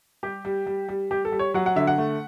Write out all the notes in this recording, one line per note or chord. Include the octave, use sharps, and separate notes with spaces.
G3 G4
G3
G3
G3
G3 G4
A4
G3
C#5
F#3 F#5
F#5
D3 E5
F#5
A3